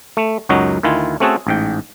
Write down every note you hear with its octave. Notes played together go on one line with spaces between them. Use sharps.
A3
C#2 F#2 F#3 C#4 D#4 F#4
D2 D#3 E4 F4 G#5
A3 C4 C#4 F#4 G#4 A4
A1 G#2 G5